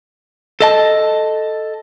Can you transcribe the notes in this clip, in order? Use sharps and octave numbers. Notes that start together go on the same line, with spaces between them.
A4 D#5 A5